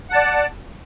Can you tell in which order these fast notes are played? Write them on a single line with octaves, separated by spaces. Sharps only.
F#5 A5 D5